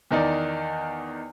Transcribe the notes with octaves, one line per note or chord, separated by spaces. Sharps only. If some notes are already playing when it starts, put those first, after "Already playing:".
E2 D#3 D#4 D5